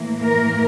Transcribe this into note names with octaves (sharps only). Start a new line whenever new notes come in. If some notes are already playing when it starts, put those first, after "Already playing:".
Already playing: A2 E3 A#3
A#4